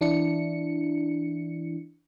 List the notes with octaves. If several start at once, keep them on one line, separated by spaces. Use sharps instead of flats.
E3 D4 E4 C#7